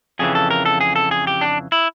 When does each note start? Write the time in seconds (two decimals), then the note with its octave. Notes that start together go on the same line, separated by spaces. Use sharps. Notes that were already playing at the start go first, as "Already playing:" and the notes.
0.19 F2 C#3 E3 G#4
0.35 A4
0.51 A#4
0.66 A4
0.81 G#4
0.96 A4
1.11 G#4
1.27 G4
1.41 D4
1.72 E4